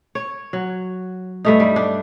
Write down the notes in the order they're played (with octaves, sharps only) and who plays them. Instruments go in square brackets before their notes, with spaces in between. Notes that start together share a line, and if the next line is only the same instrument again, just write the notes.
[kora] C#5
F#3
G2 A3 D#4
G3
D4